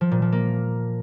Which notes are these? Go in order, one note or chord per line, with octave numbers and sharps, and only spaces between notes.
F3
A#2
F3
A#3